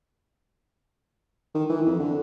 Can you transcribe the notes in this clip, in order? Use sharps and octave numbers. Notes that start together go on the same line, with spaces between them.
D#3
E3
F2
D3